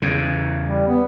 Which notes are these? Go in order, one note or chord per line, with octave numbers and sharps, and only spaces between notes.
E2 C#3
G3
B3